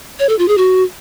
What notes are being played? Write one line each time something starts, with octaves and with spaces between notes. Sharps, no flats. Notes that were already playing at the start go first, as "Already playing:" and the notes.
C#5
A4
F4
G#4
F#4